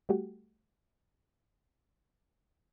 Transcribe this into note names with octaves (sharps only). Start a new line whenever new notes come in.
G3 A3 F#4 G4